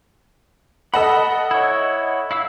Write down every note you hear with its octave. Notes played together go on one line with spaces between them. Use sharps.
A4 D#5 F#5 A5 B5
E4 C#5
E4 F5 E6